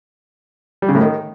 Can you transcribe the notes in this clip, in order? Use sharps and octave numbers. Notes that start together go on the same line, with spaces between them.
G3
C#3
A2
D#3